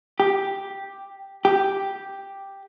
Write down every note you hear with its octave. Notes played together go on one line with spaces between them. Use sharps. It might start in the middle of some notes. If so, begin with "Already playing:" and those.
G4
G4